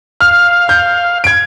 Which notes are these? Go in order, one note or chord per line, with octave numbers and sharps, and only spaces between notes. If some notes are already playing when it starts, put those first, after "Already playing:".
F5 F6
G6
G#6 D7